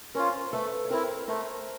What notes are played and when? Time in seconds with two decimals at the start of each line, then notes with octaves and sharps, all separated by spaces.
0.15 C#4 F4 A#4 C5
0.53 A3 A4 B4
0.85 C#5
0.90 C4 E4 A#4 C5
1.28 A3 A#4 C5